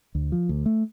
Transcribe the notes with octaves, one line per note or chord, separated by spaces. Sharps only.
D2
F3
D2
A3